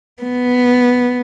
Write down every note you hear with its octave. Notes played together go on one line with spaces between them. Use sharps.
B3